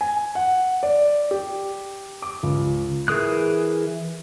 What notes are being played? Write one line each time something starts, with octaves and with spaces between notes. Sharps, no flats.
G#5
F#5
D5
G4
D6
C#2
E3 G#4 A#4 D#6 F#6